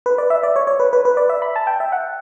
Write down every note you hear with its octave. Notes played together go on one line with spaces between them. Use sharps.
B4
D5
E5
D5
C#5
C#5
B4
B4
B4
D5
E5
B5
A5
G5
E5
F#5